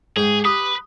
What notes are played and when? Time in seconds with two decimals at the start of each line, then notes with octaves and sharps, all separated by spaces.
0.17 G#2 G#4 G5
0.45 G4 B4 D#6